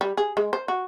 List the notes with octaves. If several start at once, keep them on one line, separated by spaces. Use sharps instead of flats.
G3
G#4
G#3
C5
F#4